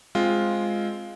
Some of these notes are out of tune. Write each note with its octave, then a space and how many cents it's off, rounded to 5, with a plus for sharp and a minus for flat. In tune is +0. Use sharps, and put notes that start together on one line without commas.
G#3 +0 C4 +0 F4 +0